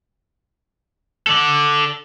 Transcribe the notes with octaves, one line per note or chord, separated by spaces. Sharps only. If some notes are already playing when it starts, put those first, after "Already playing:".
A4 D5